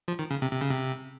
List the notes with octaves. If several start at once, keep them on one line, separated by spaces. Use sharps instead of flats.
F3
D#3
C#3
C3
C3
C#3
C3